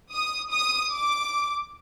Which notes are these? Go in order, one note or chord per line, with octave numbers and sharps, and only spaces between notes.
D#6
D#6
D6